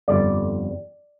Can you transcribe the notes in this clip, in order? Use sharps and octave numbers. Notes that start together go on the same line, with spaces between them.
G1 F2 D3 G3 D5